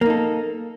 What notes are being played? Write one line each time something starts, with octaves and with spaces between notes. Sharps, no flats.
A#3 D#4 A4